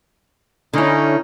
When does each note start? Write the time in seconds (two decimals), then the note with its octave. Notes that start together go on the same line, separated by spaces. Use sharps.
0.73 D3 C#4 D#4 E4